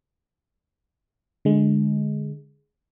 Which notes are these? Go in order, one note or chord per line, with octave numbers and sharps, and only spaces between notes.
D3 G#3